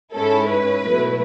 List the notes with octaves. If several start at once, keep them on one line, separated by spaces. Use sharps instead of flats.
G#2 G#3 C#4 E4 A4
B4
B2 F#3 A3 E4